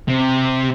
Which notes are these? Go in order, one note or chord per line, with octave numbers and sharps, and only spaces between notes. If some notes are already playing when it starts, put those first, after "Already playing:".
C3